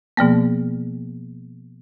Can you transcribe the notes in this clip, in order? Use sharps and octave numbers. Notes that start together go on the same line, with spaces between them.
B2 F3 A#3 B3